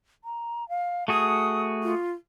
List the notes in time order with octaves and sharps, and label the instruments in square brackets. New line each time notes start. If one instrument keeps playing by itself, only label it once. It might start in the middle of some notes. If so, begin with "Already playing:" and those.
[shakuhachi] A#5
F5
[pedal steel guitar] A3 F#4 G#4 [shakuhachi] D#6
[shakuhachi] F4